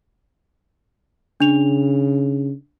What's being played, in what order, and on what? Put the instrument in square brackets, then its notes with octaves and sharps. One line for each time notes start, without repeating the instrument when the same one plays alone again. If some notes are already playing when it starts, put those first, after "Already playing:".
[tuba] C#3 [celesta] D4 F7